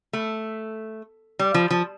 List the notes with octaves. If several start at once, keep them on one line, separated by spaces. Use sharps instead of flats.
A3
G3
F3
F3